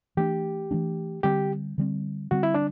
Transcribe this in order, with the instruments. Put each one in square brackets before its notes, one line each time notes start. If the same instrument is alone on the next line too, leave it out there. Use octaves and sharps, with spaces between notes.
[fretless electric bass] E3 A3 D4 [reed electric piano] G4
[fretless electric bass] E3 A3 D4
[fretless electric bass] D3 G3 C4 [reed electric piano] G4
[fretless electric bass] D3 G3 C4
[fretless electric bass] D3 G3 C4 [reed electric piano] F#4
[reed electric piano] E4
D4